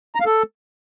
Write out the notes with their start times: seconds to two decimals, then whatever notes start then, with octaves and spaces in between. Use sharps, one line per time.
0.15 A#5
0.20 F5
0.26 A4